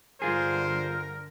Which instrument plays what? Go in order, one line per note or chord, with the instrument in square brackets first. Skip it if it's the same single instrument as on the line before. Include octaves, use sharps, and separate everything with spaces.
[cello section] G2 D3 [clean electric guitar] F4 G#4 [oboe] A#4 [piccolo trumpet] C5